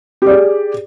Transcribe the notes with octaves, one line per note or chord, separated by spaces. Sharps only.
G4 G#4 D5